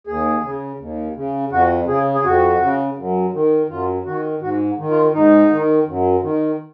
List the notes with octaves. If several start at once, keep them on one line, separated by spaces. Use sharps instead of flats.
D#2 G#4
C#3
D#2
C#3
F2 F#4
C#3 G#4
G#4
F2 F#4
C#3
F#2
D#3
F#2 F4
D#3 F#4
G#2 F#4
D#3
F4
G#2 D#4
D#3
F#2
D#3